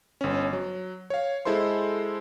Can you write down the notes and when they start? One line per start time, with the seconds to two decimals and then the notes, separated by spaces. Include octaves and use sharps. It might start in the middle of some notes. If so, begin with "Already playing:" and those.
0.21 G1 C#4
0.53 F#3
1.10 C#5 F5
1.45 G#3 E4 A4 C5 C6